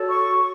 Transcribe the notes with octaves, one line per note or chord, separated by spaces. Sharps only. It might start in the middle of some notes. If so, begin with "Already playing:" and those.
Already playing: F#4 A4 C#5
C#6